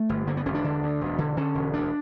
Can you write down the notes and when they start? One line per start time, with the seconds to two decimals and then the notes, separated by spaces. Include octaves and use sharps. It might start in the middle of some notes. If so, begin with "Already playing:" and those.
Already playing: A3
0.09 G1
0.27 D3 A#3
0.37 B3
0.46 E1 C#4
0.55 D4
0.64 D3
0.83 D2
1.01 E1
1.18 D3
1.37 D3 C#4
1.55 E1
1.74 D2 D4